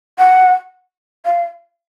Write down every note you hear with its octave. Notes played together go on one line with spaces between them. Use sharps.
F#5
F5